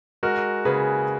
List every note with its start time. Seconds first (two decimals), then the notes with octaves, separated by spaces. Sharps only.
0.23 G#3 F#4 A#4
0.65 C#3 G#4 B4